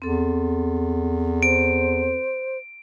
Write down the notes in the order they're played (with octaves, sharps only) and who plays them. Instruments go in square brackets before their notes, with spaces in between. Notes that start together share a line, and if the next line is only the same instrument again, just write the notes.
[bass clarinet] E2 [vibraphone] C4 A4
[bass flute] C5 [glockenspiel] D7